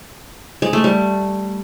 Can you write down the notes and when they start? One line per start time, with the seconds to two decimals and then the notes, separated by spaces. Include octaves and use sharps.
0.62 G#3
0.73 A3
0.84 G3